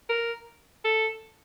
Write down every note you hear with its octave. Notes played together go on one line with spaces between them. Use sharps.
A#4
A4